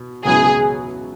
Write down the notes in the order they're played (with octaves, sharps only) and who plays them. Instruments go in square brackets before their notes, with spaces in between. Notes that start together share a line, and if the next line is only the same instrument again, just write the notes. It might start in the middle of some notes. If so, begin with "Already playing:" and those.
Already playing: [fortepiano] B2
[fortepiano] C#2 B2 F#3 B3 E4 [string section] G#4